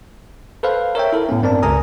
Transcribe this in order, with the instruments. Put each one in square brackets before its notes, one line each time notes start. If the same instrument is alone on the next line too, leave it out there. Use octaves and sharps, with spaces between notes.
[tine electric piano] A4 B4 C5 F5
A#4 C#5 E5 G5
E4 A4 A#4
A2 B3 C#4
G2 C4 A#4 D5 A5
C#2 A#4 G#5 A#5 D#6